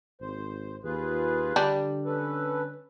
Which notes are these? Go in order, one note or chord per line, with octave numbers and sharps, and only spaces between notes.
G#1 C5
D#2 F4 G#4 B4
D3 G3 D4
C#4 A4 B4